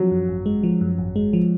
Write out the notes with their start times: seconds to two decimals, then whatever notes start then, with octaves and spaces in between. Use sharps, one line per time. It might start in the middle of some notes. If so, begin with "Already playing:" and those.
Already playing: F3 F#3
0.11 F#2
0.28 G#1
0.46 G#3
0.63 F3
0.81 F#2
0.98 G#1
1.16 G#3
1.33 F3